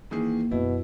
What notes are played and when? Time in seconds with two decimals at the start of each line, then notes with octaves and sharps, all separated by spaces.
0.11 D#3 E3 A#3 G#4
0.51 F#2 B2 E4